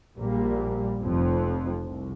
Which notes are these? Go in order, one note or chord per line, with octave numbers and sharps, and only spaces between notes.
A#1 A#2 G3 A#3
F1 F2 F3
C2